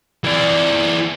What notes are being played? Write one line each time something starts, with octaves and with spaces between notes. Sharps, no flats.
E3 D5